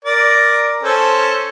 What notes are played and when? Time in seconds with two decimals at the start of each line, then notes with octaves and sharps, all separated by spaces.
0.05 A#4 D5
0.83 C#4 A4 C5